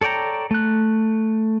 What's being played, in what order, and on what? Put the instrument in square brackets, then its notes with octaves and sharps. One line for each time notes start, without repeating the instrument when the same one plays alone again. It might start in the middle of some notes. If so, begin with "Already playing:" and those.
[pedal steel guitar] A4 C#5 D5 G5 A#5
A3 F#6